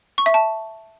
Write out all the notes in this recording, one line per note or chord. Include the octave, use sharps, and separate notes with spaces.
C#6
E5
A5